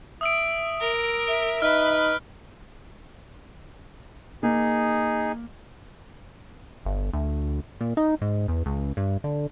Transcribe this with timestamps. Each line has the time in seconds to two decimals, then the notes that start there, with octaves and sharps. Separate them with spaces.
0.21 E5 D#6 E6 D7
0.80 A#4
1.28 E5
1.62 D#4 B4 F6
4.43 A#3 D#4 G#4
6.85 G1
7.13 D2
7.81 A#2
7.97 D#4
8.22 G#2
8.48 E2
8.66 C#2
8.97 G2
9.24 D3